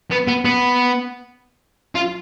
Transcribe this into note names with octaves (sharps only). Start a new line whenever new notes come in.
B3
B3
B3
F4